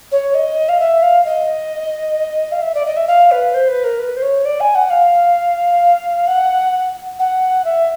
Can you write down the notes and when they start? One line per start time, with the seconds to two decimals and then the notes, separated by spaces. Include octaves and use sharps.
0.11 C#5
0.34 D#5
0.68 F5
0.79 E5
1.02 F5
1.25 D#5
2.51 F5
2.61 E5
2.74 D5
2.85 D#5
2.96 E5
3.07 F5
3.31 B4
3.54 C5
3.68 B4
3.83 A#4
3.99 B4
4.16 C5
4.22 C#5
4.45 D5
4.60 G#5
4.74 F#5
4.90 F5
6.27 F#5
7.19 F#5
7.64 E5